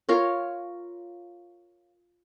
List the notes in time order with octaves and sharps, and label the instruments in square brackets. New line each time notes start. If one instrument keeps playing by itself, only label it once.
[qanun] F4 A#4 C#5